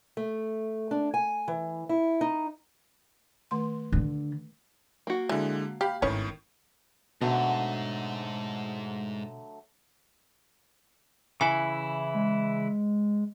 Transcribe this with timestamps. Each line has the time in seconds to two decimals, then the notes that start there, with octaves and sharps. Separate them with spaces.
0.17 A3
0.91 D4
1.14 G#5
1.48 E3
1.89 E4
2.21 D#4
3.51 D#3 A3 C6
3.92 D3
5.07 A#3 F#4
5.29 D3 E3 G#3
5.81 G4 F5 B5
6.02 G#1 A2 D#3 C#4 B4 C#5
7.22 G#2 B2 D3 F#3 A3 F#5
11.41 C#3 E3 E4 G#5
12.14 G#3